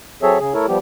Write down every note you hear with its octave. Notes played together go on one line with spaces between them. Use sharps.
F#3 C4 G#4 A4 C#5 E5
C#3 G#4
A3 E4 A4 A#4 C#5
F3 G3 B3 G4